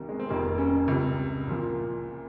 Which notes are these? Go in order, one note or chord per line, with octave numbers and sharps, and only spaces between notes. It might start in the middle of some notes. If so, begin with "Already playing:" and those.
Already playing: C2 C3 D#3 G3 A#3
G#3
C4
F1 F2 D#3 G3 A#3
C#4
C#2 C3 G3
C2 A#2 F3